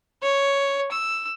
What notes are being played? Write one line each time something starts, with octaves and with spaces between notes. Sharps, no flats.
C#5
E6